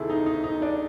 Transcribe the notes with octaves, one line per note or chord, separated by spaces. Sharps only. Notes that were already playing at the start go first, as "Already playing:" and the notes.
Already playing: D2 C3 D#3 E4 G#4 A4
D#4
D#4
D#4
D4